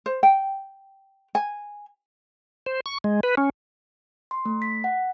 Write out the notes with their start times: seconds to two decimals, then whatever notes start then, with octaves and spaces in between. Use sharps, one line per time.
0.06 C5
0.23 G5
1.35 G#5
2.66 C5
2.86 C#6
3.04 G#3
3.23 B4
3.37 C#4
4.31 C6
4.45 A3
4.62 B6
4.84 F#5